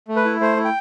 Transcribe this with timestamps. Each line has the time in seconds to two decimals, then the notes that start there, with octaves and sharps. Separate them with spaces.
0.08 A3
0.16 B4
0.25 E4
0.41 A3 C5
0.57 E4
0.65 G5